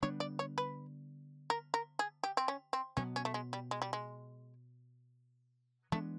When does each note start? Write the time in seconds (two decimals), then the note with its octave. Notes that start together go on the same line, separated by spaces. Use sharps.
0.02 D3 G3 B3 D4 C#5
0.20 D5
0.39 C#5
0.58 B4
1.50 A#4
1.74 A#4
1.99 G#4
2.24 G4
2.37 C4
2.48 C#4
2.73 C4
2.97 B2 F#3 B3 C#4
3.16 C#4
3.25 A3
3.34 G#3
3.53 G3
3.71 G#3
3.82 G3
3.93 G#3
5.92 E3 G#3 A3 B3 D4